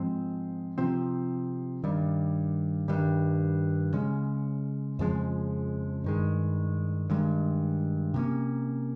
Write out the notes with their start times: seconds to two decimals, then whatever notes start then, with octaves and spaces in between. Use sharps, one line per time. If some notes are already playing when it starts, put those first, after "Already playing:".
Already playing: G#2 F3 G#3 C4
0.78 C3 F3 C4
1.84 G2 D#3 G3
2.88 G2 D#3 G3
3.93 C#3 G#3 C#4
4.99 F2 C#3 F3 G#3
6.04 G2 D#3 G#3
7.10 G2 D#3 G#3
8.14 C3 F3 A#3 C#4